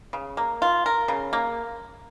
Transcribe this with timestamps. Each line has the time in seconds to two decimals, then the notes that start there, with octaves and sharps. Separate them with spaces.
0.13 C#3
0.37 A#3
0.62 F4
0.86 A#4
1.08 C#3
1.33 A#3